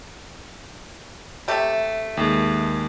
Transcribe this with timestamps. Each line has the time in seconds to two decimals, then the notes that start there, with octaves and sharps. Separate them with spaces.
1.48 C3 A3 G4
2.17 D#2 G#3